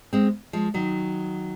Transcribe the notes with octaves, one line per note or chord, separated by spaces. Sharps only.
G#3 C4
F3 G#3
D#3 F#3